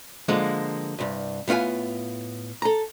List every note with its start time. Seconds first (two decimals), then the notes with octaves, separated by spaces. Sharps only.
0.28 D3 F3 G#3 A#3
0.99 C2 G2
1.48 A2 B3 F4 F5 G#5
2.62 A4 A#5